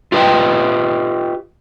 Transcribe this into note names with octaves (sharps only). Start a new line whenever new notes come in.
F4 G4 B4 D5 D#5 G5